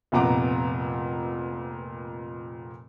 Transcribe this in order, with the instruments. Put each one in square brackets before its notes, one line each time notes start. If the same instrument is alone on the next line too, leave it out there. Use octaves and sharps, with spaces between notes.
[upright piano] F1 F2 A#2 B3 A#5 D6